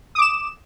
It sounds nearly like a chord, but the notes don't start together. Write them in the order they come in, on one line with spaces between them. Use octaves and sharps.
D#6 D6 E7